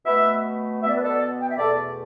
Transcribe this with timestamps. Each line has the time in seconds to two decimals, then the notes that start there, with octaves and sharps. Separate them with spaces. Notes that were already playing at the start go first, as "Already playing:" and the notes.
0.05 B2 A3 B4 E5
0.81 B2 E5
0.86 B3 D5
0.96 B4
1.03 A4 D5
1.41 G5
1.50 E5
1.58 E2 B2 A3 A4 D5